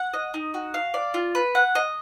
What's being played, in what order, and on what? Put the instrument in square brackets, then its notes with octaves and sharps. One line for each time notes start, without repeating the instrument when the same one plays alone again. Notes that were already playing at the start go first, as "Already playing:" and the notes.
Already playing: [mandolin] F#5
D#5
D#4
F#4
F5
D5
F4
B4
F#5
D#5